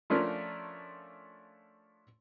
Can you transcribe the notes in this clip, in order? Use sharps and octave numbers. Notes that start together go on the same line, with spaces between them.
F3 A3 C#4 D4 F4 A#4